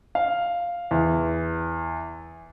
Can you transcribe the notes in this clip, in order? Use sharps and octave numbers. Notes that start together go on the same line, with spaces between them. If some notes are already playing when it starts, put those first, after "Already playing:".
F5
E2